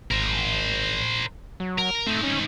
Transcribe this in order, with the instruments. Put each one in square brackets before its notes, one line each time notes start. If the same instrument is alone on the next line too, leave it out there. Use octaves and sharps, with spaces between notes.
[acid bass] G#1 [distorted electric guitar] A#4 C5
[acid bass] F#3
[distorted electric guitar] A#4
[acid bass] A3 [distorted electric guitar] C4 D#4
[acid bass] C#4